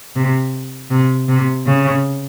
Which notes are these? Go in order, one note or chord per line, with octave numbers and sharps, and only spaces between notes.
C3
C3
C3
C#3